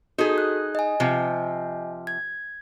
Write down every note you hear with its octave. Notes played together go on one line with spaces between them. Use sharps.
D#4 F#4 G#4 A4
F#6
D#5 G#5
C3 F3
G#6